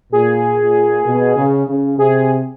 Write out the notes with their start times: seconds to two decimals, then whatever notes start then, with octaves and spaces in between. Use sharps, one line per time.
0.12 A#2 G#4
0.59 A#2
1.05 B2
1.37 C#3
1.67 C#3
1.98 C3 G#4